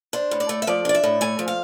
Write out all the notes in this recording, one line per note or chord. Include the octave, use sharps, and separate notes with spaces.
D4 C5
A2
D5
A3
E5
F3 D5
D4 D5
E5
A2
A3 G#5
F3
F5